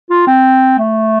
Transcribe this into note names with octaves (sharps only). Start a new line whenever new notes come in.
F4
C4
A3